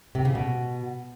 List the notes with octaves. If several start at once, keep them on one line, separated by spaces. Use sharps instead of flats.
C3
C#3
B2